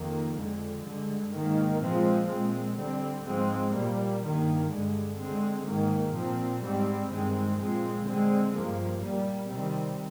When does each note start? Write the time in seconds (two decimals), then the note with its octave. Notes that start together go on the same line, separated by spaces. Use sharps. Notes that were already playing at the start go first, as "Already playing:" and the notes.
Already playing: F2 D#3 A#3
0.36 F2 D3 G#3
0.84 G2 D3 G#3
1.32 G#2 D#3 A#3
1.80 A#2 F3 G#3 C4
2.28 A#2 G#3 C4
2.76 D3 G3 C4
3.24 G#2 F3 G#3 C4
3.72 A#2 G3 A#3
4.21 G2 D#3 A#3
4.68 G2 D3 G#3
5.16 D3 G#3 C4
5.65 G#2 D#3 A#3
6.13 A#2 F3 C4
6.61 G#2 G3 C4
7.08 G2 D#3 G#3 C4
7.56 A#2 F3 G#3 C4
8.05 D3 G#3 C4
8.52 G2 F3 A#3
9.00 A#2 G3 A#3
9.48 C3 D#3 G3 C4